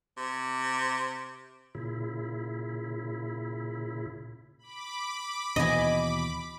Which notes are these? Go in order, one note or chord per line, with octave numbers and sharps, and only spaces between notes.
C3
A#2 C#3 E4
B5 D6
D#2 B2 E3 D#5 G#5